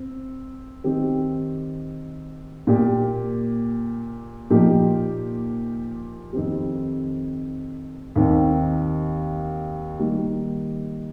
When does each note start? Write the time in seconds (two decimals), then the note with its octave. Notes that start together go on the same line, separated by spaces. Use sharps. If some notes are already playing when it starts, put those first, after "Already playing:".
Already playing: C4
0.84 D#3 C4 G4
2.67 A#2 A#3 G4
4.50 A#2 F3 A#3 D#4 G4
6.33 F2 D#3 C4 G4
8.16 D#2 D#3 C4
9.99 D#3 G3 A#3